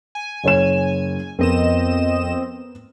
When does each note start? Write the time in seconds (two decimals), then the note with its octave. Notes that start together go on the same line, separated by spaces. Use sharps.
0.15 G#5
0.44 F#1 C#5 E7
1.39 F2 B3 C4 A#4 D#5 E7